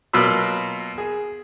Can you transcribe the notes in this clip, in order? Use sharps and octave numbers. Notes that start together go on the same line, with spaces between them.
B2 F#3 A#3 F4 B5 E6
G#4